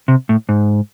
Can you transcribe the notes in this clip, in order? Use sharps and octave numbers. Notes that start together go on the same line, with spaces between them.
C3
A2
G#2